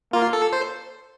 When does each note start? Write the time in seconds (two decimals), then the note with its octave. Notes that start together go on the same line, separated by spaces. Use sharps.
0.13 A#3 F4
0.33 A4
0.53 C5